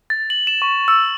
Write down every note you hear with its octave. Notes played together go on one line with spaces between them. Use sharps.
A6
F#7
E7
C#6
E6